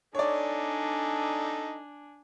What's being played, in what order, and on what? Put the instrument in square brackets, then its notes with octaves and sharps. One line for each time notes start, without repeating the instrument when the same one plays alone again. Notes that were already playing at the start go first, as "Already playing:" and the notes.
[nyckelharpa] D4 G#5 [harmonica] D#4 A4 [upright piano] C#5 D5